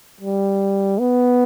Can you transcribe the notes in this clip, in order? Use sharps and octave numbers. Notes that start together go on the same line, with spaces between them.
G3
B3